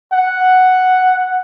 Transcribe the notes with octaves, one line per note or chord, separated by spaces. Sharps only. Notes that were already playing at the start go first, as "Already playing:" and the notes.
F#5